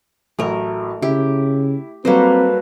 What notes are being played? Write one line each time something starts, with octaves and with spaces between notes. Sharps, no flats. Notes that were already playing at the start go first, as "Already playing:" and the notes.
A1 A2 F#3 A3 A#4
C#3 E4 G4
F#3 G3 A#3 C4 F#4 A4 B4 C5